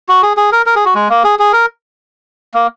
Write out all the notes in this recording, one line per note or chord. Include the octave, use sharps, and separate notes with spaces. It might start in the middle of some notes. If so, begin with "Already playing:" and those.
F#4
G#4
G#4
A#4
A#4
G#4
F#4
G#3
A#3
G#4
G#4
A#4
A#3